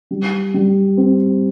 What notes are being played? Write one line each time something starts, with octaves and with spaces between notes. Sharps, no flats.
G3
G3
C4